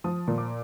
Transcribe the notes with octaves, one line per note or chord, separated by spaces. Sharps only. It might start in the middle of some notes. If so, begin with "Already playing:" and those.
F3 D#6
A#2
D6